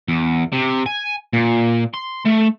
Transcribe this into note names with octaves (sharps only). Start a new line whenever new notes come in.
E2
C3
G#5
A#2
C6
A3